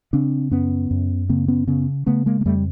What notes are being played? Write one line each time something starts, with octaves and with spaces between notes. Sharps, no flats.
C#3 C4 D4
F#2 B3 C#4
F#2
C#3 A#3 C4
B3 C#4
C#3 B3 C#4
C#3 A3 B3
G#3 A#3
A#3
F2 G3 A3